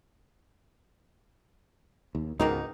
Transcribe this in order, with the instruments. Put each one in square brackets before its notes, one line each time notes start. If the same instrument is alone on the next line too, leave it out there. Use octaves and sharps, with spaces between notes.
[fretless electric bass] D#2
[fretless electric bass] C#2 G#2 B2 [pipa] D#3 A#3 D#4